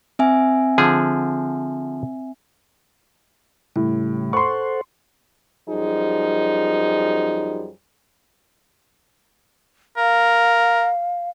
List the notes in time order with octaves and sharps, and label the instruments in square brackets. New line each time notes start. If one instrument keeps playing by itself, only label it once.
[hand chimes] C4 E5 G#5
[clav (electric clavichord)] D3 F3 G#4
[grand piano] A2 [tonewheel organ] C#3 G3
[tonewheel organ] A4 C5 F#5 [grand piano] C6 C#6
[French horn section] F#2 F3 G3 D#4 G#4
[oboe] A#4 [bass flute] F5